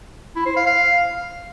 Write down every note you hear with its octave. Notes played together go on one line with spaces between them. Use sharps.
E4
C5
F5
F5